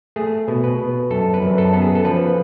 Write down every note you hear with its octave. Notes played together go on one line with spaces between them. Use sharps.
A3 G#4
B2
B4
B2
F#2 A4
B4
F#2
A4
B3 A4
G#4
A4
F3 B4